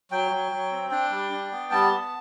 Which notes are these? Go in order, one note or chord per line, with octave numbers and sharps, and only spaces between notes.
F#3 G5
F#3
F#3
C4
D4 G5
G3
D4
B3
G3 A5
B3